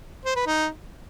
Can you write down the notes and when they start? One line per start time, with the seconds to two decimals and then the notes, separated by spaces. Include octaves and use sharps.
0.25 C5
0.35 B4
0.46 D#4